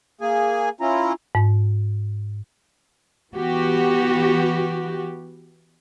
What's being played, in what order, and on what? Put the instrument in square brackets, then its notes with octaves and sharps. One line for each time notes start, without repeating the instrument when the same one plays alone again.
[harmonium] A#3 G#4 G#5
C#4 E4 F4 A#5
[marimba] G#2
[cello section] E3 B3 F#4 G4